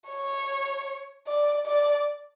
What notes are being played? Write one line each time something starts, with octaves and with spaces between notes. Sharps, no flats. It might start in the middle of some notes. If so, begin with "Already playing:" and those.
C#5
D5
D5